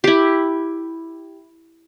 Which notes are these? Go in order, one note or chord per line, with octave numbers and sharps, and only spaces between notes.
E4 G4